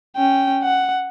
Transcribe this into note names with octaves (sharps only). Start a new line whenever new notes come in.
C#4 G5
F#5